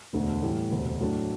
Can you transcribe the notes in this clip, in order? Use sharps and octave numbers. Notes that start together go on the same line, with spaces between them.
E1 D2 D3 A3
A2 E3 G3
E1 D2 C3
A2 F#3 A3 D4